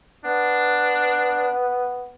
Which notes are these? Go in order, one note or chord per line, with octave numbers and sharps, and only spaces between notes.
B3 D4